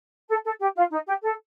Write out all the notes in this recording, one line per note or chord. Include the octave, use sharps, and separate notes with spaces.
A4
A4
G4
F4
D#4
G4
A4